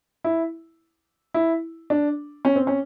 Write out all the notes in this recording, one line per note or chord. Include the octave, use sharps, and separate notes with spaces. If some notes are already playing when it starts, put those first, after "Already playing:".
E4
E4
D4
C#4
C4
C#4